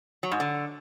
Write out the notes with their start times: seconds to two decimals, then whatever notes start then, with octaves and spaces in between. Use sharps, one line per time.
0.23 F#3
0.32 G#2
0.40 D3